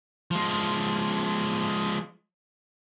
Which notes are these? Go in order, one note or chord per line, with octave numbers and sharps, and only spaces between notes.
F3 G#3